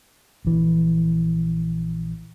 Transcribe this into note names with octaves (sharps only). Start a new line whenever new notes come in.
A#1 E3